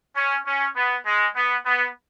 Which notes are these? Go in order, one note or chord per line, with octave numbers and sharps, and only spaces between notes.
C#4
C#4
B3
G#3
B3
B3